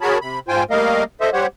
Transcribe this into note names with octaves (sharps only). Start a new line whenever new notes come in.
F#4 G#4 A#4 C#5 A5 B5
C3 B5
G#2 F4 C5 G5 G#5
G3 A3 A#3 A#4 D#5 F5
A4 C5 D#5 E5
G3 G4 C5 C#5 F#5